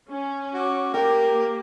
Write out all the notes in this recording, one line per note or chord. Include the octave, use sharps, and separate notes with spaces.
C#4 G#5
F#4 D6
A#3 G4 A#4 G5